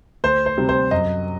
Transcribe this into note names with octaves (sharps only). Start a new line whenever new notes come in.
D2 C5
C5
C3 G3 C4
C5
F#2 D#5